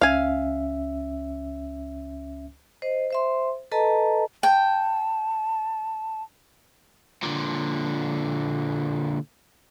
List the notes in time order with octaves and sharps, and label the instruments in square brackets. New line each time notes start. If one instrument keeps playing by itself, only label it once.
[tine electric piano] C#2 C#4 E5 [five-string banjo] F5 G#5
[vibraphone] C5 D#5
C5 E5 C6
A4 B4 D#5 A5 A#5
[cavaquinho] G5 [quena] A5
[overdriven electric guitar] A#2 D3